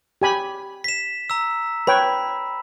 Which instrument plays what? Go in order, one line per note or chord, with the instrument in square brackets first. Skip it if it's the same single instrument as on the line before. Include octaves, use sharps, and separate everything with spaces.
[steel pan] G4 G#5 B5
[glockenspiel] B6 E7
A#5 E6
[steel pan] B4 C#5 G5 [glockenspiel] B5